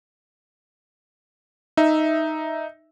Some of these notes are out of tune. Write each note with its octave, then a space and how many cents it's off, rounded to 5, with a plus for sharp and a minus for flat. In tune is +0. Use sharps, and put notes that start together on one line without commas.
D#4 +0 E5 -5